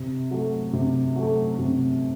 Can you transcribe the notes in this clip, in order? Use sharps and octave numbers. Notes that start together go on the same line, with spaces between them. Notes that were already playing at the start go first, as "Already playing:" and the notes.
Already playing: C3
F#3 A3
C3
F#3 A3
C3